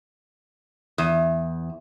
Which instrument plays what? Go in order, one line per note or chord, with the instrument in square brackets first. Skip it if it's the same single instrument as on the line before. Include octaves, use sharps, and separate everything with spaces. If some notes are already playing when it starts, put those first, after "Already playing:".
[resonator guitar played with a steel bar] E2